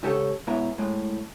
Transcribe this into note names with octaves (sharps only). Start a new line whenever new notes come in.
G#2 C#3 G4 A4 C#5
G#2 B2 E4 C#5 E5 A#5
A2 G#3